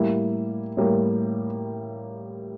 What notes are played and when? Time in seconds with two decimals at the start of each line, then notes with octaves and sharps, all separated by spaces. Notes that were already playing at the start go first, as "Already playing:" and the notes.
Already playing: A2 G3 A#3 E4
0.77 A2 G3 A#3